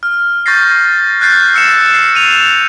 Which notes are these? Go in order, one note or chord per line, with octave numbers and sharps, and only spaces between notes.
F6
C#6 G6 A6 A#6 C7
F#6 G6 A6 C7
E6 C#7 E7
C7
D#7 F7